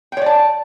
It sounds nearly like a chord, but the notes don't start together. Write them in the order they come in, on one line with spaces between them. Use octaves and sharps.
G5 C#5 D5 A5